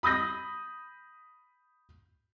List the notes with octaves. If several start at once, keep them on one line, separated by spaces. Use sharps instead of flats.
B5 D#6 G6 A#6